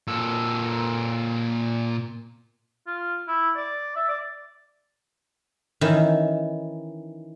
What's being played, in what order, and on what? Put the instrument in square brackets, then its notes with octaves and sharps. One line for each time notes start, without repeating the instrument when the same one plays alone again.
[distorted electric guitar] A#2 A4
[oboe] F4
E4
D5
E5
D5
[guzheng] D#3 E3 C#4